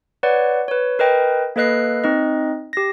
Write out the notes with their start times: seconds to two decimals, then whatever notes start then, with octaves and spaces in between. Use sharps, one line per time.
0.23 B4 C#5 D5 F#5
0.68 B4 C#5
0.99 A#4 B4 D#5 G5
1.56 A#3 A4 B4 D#5 F#6 C7
2.04 C4 D#4 D#5
2.73 G4 A#6